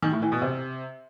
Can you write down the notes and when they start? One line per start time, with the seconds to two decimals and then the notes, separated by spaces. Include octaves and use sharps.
0.02 D#3
0.12 A2
0.22 E3
0.32 B2
0.42 C3